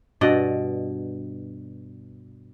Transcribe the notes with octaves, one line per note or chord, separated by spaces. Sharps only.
G2 B2 D5 D#5